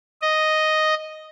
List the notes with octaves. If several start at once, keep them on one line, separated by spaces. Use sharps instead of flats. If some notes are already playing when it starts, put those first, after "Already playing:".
D#5